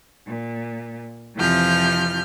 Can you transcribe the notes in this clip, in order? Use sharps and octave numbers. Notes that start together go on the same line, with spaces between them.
A#2
F2 C3 E3 F3 F6 G6